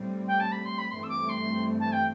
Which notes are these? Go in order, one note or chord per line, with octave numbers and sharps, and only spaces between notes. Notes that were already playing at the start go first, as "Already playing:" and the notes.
Already playing: A2 G3 C4
G5
A5
B5
C6
B5
G2 E3 A3 C4 C6
E6
D6
C6
A5
G5